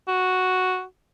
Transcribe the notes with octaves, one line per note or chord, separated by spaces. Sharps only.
F#4